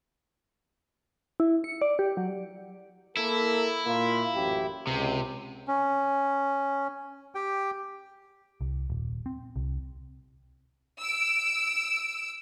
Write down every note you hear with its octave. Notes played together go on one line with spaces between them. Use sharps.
E4
C#7
D5
G4
F#3
A#3 E4 A4 A#4
A#2 A#3 F4
A1 F#2 G4
C#2 C3
C#4
G4 G5
C2
D#1
C4
C2
E6 D7